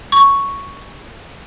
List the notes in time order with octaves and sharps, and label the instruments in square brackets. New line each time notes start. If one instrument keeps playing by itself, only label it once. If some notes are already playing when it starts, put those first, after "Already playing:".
[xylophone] C#6